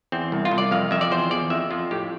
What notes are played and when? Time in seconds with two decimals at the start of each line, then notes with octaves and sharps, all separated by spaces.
0.12 E2 C4
0.32 C2
0.45 F4
0.51 C2
0.58 D5
0.71 F2 F5
0.91 F2 E5
1.01 D5
1.11 E2 C5
1.31 E2 D5
1.50 F2 E5
1.71 F2 F4
1.91 A2 G4